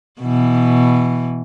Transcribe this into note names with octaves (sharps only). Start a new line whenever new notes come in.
B2 E3